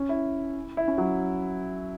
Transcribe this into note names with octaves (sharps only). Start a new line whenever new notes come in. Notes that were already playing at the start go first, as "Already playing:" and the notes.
Already playing: C#4
E4
E4
C#4
F#3